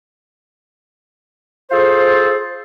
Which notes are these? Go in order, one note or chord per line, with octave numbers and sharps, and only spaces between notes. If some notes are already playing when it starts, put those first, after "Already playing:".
F4 G#4 A4 C5